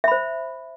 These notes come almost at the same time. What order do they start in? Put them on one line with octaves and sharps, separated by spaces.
E5 B5 C5